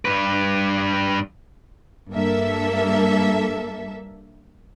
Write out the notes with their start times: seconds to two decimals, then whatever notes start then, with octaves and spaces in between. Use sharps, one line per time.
0.05 G2 B4
2.12 G2 A#3 A4 E5